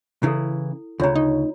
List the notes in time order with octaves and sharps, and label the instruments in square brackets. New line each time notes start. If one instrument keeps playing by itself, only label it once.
[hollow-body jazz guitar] C#3 E3 [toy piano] E4 A4
[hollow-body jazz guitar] D2 C#3 [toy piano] F4 C#5 A#5
[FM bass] D#4